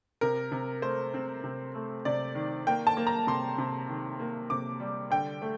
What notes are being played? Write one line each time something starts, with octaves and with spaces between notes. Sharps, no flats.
C3 A#4
C3
A3 C5
C4
C3
A3
C3 D5
D#3
A#3 G5
A5
A#3
A#5
C3 C6
C3
D#3
A#3
C3 D6
G3
D3 G5
A3